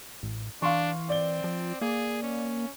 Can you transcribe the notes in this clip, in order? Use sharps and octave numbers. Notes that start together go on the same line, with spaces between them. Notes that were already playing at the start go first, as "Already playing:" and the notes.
A1
E3 D4 F5 C6 C#6
C4 D5 G7
F3
A#3 G#4
C#4